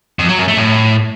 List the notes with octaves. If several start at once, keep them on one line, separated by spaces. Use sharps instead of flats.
F2
F#3
F#2
A3
A2